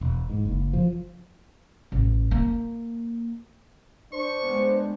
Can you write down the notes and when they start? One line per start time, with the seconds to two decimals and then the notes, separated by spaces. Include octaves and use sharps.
0.01 E1
0.30 G#2
0.45 F#1
0.73 F3
1.92 A1
2.31 A#3
4.12 D4 C5 C#6
4.42 G#3 B3